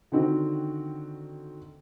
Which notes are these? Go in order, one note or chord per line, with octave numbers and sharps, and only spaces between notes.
D3 D#3 C4 F#4